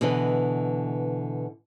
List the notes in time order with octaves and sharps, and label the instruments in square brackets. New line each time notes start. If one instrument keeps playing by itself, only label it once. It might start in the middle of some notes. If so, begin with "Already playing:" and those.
[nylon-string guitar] B2 D3 E3 B4 D#5